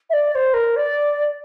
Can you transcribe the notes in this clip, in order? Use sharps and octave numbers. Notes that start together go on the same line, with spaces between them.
E5
D5
D5
C5
A#4
D5